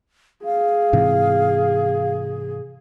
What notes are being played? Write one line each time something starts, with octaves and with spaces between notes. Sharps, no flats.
G#4 F5
G#2 C3 E3